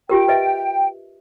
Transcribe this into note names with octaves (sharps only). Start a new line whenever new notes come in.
F4 G4 A#4 G5
B4 D#5 E5